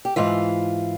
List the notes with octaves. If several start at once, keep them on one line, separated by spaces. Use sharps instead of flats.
G4
G#2 E3 F4